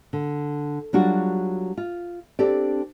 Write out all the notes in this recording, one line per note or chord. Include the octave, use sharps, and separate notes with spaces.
D3
F#3 G3 D4 F4 F#4
F4
C4 D4 G4 A4 D5